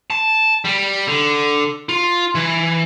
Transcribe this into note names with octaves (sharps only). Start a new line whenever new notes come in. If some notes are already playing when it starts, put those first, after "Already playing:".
A5
G3
D3
F4
E3